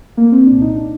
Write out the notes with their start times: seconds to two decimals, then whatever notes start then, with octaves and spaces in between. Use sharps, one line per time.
0.17 A#3
0.32 C4
0.46 C2 A#2 D4
0.61 D#4
0.76 D4